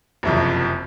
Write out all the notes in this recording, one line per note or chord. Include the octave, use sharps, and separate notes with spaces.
F#1 C2 F2